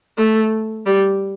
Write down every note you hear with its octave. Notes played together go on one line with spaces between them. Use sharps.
A3
G3